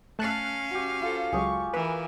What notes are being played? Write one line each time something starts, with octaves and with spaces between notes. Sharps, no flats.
A3 C#4 F5 A5 F#6
F#4 G4
F4 A4 C5
C#2 F#3 G#3 G4 G#4 C#6
E3 A#4 B4